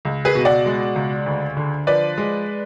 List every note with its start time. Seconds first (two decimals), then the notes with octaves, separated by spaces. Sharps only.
0.05 C#2
0.25 G#4 B4
0.35 B2
0.45 D5 F#5
0.66 G#3
0.96 C#2
1.26 D2
1.57 D3
1.87 F3 B4 D5
2.17 G#3